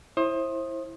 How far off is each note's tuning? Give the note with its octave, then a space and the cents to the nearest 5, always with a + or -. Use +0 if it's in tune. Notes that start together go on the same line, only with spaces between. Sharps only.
E4 +0 C5 +30 D#6 +0